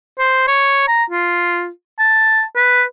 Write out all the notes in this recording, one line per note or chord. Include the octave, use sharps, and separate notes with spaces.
C5
C#5
A#5
F4
A5
B4